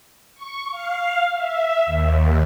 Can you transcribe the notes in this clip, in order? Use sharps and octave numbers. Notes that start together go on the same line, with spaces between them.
C#6
F5
E5
D#2